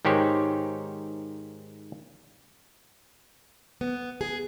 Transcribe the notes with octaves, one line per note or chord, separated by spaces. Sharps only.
G#2 D#3 G4 C5 C#5
B3
G#4